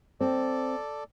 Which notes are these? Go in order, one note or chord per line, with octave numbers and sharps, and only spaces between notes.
C4 A4 D5